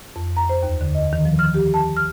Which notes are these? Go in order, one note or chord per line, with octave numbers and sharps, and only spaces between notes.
F2
A#5
C5
D#2
D3
D#5
D#3
F3
F6
G4
A5
F6